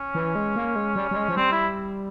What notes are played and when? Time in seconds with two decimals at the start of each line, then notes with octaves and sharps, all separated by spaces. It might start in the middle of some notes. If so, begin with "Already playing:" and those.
Already playing: C#4
0.15 E3
0.35 G#3
0.56 A#3
0.76 G#3
0.96 G3
1.11 G3
1.16 G#3
1.28 F3
1.36 G3 C4
1.52 E4